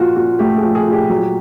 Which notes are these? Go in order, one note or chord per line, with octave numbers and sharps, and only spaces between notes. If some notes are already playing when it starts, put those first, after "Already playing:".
Already playing: A#2 F3 F4 F#4
A#2 F#4
A3 G4
G#4
F3
G#4
A#2
G4
F#3